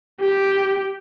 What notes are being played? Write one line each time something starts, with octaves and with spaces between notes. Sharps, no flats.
G4